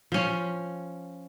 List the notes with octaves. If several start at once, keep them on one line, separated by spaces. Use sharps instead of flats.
F3 C#4